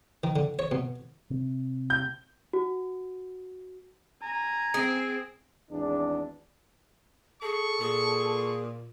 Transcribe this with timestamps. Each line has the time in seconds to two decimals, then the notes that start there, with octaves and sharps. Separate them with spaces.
0.24 D#3
0.36 D3
0.59 C#5
0.71 B2
1.30 C3 C4
1.90 G6
2.53 F#4
4.23 G#5 A#5
4.74 C4 G#4
5.70 G#1 E2 D4
7.42 G#4 A4 C#6
7.80 A#2 G#4